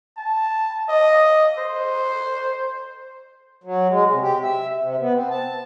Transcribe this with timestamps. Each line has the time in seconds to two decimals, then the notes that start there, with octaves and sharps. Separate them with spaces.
0.17 A5
0.89 D#5
1.58 C5
3.64 F#3
3.89 G#3
4.11 C3
4.22 G4
4.43 E5
4.80 C3
5.00 B3
5.13 C4
5.30 A5